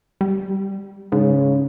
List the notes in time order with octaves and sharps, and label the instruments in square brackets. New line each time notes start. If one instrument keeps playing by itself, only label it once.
[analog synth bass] G3
[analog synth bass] G#2 [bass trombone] C#3